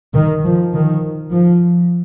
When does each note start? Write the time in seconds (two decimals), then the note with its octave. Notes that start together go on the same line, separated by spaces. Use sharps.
0.14 D#3
0.44 F3
0.73 D#3
1.31 F3